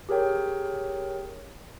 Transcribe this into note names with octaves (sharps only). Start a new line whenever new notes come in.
G4 G#4 A#4 C#5 G5